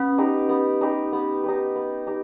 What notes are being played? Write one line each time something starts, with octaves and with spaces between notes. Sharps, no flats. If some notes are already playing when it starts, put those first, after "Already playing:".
Already playing: B3 C#4
D#4 G4 B4
B3
D#4 G4 B4
B3
D#4 G4 B4
B3
D#4 G4